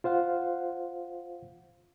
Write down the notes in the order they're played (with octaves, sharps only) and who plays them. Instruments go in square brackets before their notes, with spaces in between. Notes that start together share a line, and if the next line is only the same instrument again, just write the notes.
[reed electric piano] F4 C5 F5 F#5